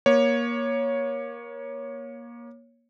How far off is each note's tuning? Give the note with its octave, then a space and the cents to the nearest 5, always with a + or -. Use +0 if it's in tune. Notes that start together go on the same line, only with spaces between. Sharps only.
A#3 +25 C#5 +0